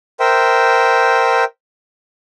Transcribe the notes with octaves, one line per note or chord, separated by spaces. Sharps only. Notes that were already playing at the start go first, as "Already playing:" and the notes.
A#4 C5 E5 G5